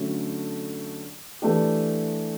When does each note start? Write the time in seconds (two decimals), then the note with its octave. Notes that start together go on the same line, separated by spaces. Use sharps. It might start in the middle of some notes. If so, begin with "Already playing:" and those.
Already playing: D3 F#3 A3 C#4
1.42 E3 A3 D4 G4